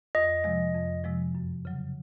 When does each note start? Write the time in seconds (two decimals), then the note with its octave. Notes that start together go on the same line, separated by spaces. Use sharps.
0.15 F2 D#5
0.44 C3 F3 G#3
0.75 F2
1.04 C3 F3 G#3
1.35 F#2
1.65 C#3 F#3